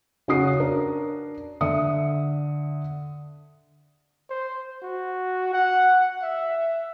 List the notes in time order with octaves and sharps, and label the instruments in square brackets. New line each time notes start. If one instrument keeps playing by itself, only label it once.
[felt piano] C#3 C#4 F#4 D#6 C7
D4 A#4
D3 E5 D#6 C#7
[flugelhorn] C5
F#4
F#5
E5